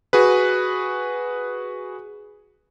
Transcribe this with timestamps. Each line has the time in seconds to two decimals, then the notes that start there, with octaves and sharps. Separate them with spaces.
0.13 F#4 G#4 B4